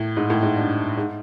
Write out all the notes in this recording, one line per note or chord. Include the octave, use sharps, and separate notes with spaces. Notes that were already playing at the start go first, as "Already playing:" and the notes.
Already playing: A2
G#2
A2
G#2
G2
G#2